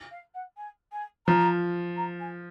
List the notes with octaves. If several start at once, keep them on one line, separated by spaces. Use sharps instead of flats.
F5
F#5
G#5
G#5
F3 A#5
A#5
G#5